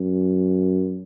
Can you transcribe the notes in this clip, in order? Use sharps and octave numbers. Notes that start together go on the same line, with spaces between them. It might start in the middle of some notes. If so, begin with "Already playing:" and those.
Already playing: F#2